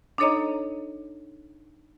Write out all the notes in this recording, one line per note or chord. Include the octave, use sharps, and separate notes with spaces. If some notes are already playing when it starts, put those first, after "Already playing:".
D4 D#4 A4 C#5 D#5 A#5